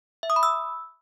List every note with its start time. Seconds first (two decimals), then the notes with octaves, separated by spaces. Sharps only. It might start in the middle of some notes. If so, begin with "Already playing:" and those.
0.23 E5
0.30 D#6
0.36 B5
0.43 E6